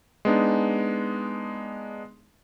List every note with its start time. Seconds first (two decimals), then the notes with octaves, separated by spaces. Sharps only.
0.25 G#3 B3 D4 D#4